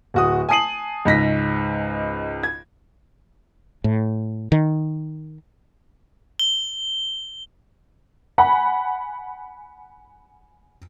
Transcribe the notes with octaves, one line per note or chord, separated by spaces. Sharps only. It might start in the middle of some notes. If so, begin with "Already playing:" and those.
D1 F#4 D#6
G#5 A5 D#6 C7 D#7 F#7
C#2 G#2 A#6 B6
G#6
A2
D#3
G7
F#5 G#5 B5